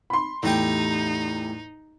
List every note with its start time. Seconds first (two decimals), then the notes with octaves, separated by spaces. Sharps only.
0.10 B5 C6
0.43 E2 A2 D#4 G4 G5